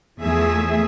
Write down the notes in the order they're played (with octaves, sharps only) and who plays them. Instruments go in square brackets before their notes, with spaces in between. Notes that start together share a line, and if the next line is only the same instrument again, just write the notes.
[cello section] E2 F3 A3 G#4 E5